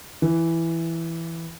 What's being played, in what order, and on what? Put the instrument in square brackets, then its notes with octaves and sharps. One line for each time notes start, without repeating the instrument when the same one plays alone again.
[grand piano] E3